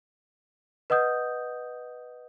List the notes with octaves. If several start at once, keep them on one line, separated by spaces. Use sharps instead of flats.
B4 D#5 F#5 D#6 G6